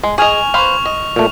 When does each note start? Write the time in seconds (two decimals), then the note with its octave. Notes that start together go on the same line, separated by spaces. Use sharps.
0.03 G#3
0.18 G#4 D#5 G#5 C#6 F6 F7
0.54 B4 C5 F5 C#6 F7
0.85 D#5
1.16 A#2 A3